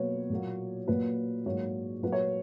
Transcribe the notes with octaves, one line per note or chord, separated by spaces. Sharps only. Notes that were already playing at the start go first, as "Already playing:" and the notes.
Already playing: B2 F#3 A#3 B4 C#5
A#2 F#3 A#3
A#2 F#3 A#3 B4
G#2 F#3 A#3 C#5
A#2 F#3 A#3 B4
C#5